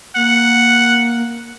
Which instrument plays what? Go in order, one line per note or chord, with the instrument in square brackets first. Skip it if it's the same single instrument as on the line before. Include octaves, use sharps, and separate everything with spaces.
[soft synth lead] A#3 [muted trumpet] F#5